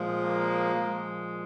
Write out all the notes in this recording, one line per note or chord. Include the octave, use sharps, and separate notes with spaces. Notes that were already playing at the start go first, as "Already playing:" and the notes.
Already playing: A#2 F3 G#3
A#3
A#2 F3 G#3